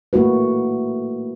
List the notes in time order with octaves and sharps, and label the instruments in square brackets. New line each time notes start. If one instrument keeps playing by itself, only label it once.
[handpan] A3 A#3 E4 F#4 B4